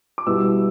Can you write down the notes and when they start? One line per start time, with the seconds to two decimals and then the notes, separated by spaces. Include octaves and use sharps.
0.18 D6
0.26 B2 G3 B3 E4 E6